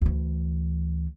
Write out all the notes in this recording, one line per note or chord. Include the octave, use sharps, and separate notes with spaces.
D2 E3